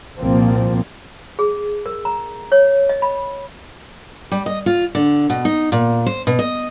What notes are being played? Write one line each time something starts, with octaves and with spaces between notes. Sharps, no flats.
C2 A#2 F3 A#3 C4
G#4
A#4
A#5
C#5
D#5
B5
G3
D#5
F4
D3
B2
D#4
A#2
C5
B2
D#5